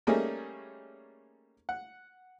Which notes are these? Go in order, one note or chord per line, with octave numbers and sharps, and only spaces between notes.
G3 A3 A#3 C#4 D#4 G#4
F#5